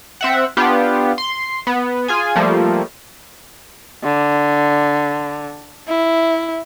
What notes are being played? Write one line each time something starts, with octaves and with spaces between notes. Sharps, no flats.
C4 E5 F#5
B3 D4 F4 G4
C6
B3
F4 G#4 G#5
F3 G3 A3 A#3
D3
E4